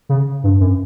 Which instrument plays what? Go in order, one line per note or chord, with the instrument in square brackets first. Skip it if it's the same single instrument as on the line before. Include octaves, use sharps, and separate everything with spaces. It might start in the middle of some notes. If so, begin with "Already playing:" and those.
[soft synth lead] C#3
G2
F#2